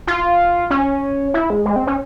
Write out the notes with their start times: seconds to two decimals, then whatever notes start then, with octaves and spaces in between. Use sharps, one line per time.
0.07 F4
0.70 C#4
1.34 E4
1.50 G#3
1.65 G#3
1.76 C4
1.87 C#4